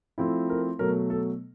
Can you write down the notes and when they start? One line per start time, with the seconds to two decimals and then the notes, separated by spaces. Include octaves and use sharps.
0.18 F3 A3 C4 E4
0.49 A#4
0.79 B2 F#3 A3 A#4
1.10 A4